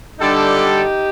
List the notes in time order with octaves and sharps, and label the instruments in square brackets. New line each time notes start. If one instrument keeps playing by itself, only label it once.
[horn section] D3 G3 D4 A4 [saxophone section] D#4 G4